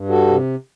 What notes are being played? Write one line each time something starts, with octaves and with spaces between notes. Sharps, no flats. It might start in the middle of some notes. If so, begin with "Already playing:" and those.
Already playing: G2
G3 F#4 A4
C3